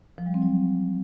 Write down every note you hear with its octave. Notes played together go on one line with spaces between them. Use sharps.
F3
G3
C4
F#3